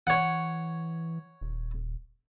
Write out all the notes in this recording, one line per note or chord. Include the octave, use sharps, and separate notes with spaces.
E3 C#5 F#5
D#1